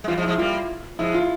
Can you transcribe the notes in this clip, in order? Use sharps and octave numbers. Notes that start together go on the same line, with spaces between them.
G#3
E3 G3 F4
F3 G#3
E4
F3 G#3
G3 A#3 F4
F3 G#3 E4
F4